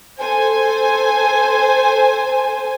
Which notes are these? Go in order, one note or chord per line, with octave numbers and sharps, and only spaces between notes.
A4 C5 G#5